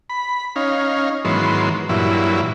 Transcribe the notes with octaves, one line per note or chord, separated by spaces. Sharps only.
B5
C#4 D#4 F5
G#2 D#3 E3 F#3 B3 C6
G2 A#2 E3 F#3 E4